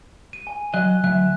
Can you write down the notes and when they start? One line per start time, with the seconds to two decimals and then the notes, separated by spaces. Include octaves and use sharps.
0.33 D#7
0.47 G#5
0.74 F#3 D#5 F#6
1.04 D2 F#3 E5 F#6